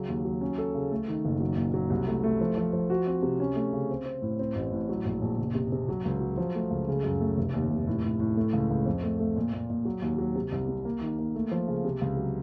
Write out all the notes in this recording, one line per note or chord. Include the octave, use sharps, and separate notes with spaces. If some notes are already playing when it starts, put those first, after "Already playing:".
Already playing: C#3 F#3
D#2
F#3
C#4
A4
C#3
A3
D#3
F#1
F#3
A#2
F#3
C2
A3
A3
F3
F3
F3
F#4
C4
C3
C#4
A3
C#3
C4
C4
A2
C4
A1
A2
F#3
A#1
A#1
F#1
C3
C3
F#3
C#2
F#3
F3
A3
C#2
C#3
F#2
A3
F1
D#2
F1
A2
A2
A2
A3
C#2
C#2
F2
A3
A3
A#2
A#2
A#2
F#3
D#2
F#3
C3
C2
C3
A#3
D#3
A#3
A3
F3
C#3
C3
C#2
F#3